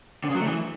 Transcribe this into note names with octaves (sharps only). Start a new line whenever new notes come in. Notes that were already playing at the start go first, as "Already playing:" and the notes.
D3
C#3
F#3
A3
E3